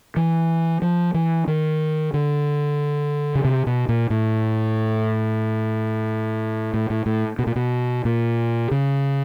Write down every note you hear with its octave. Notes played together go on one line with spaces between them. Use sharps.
E3
F3
E3
D#3
D3
C#3
C3
B2
A#2
A2
A2
A2
A2
B2
A#2
B2
A#2
C#3